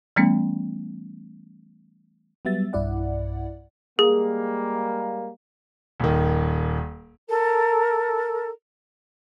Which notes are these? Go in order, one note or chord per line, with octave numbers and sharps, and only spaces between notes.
E3 G3 A3 B3 C#4
F#3 G3 B3 E5 A6
B1 G2 E4 D5 F#5
G3 G#3 A#3 G#4
D#1 D#3
A4 A#4